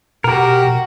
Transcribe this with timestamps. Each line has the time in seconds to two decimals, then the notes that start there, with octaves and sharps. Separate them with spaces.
0.24 B2 F#4 G4 A#4